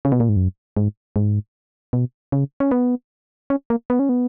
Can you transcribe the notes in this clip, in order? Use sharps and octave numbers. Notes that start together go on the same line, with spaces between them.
C#3
B2
A#2
G#2
F#2
G#2
G#2
B2
C#3
C#4
B3
C#4
A#3
B3
C#4
B3